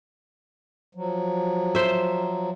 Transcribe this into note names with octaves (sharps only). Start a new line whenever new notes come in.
F3 F#3
C5 E5